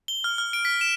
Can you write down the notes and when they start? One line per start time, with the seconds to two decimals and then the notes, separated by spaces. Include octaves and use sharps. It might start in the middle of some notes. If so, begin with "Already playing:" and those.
0.08 G7
0.24 F6
0.38 F6
0.53 D7
0.65 B6
0.81 E7